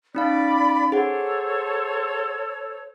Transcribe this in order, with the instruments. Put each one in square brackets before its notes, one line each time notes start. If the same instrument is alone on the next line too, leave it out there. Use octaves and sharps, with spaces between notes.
[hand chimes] C#4 D#4 F5 [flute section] D5 B5
[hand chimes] G#4 F#5 [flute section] A4 C5 C#5